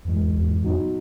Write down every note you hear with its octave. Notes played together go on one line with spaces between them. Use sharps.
F2 G#2 E3 G#3
E2
F2
E2
F2
F2 A#2 F#3 B3 D#4 F#4